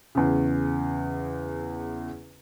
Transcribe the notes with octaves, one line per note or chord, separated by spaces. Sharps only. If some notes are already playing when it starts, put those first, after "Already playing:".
E2 C#3